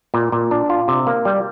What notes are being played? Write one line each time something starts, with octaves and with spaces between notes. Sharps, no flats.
A#2
A#2
D4
F4
C3
A#3
G3